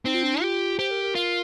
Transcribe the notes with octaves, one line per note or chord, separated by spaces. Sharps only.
C4 D#4
F4
D4
D#4
F4 G4
G4 C5
A#4
A#4
F4